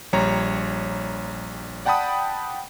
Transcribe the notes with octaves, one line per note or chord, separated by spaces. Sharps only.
A#1 G3 C#5 A#5
D5 F#5 G5 A5 B5 D#6